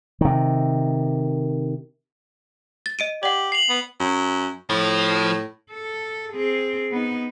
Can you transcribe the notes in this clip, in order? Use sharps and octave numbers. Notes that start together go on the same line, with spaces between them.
C3 D#3
A6
D#5 D7 D#7
G4 D5 F#5 F#7
C7 F7 F#7
B3
F#2
A2 F3
A4
C4 G#4
B3 D#4